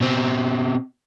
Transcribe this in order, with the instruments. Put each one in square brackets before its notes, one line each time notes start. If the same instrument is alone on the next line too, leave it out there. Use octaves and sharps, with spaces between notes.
[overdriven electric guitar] B2 C4